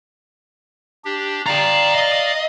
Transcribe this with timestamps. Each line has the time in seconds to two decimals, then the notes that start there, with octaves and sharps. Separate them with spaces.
1.05 D4 G4
1.47 D5 F5 G5 A#5
1.95 D#5